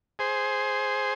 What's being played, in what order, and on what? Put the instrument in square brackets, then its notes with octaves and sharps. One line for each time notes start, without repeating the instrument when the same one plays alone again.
[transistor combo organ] G#4 C5